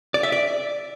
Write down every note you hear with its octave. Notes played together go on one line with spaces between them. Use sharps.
D5
E5
D5